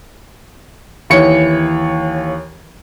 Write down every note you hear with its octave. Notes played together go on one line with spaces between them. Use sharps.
D#2 E3 C#5 C#7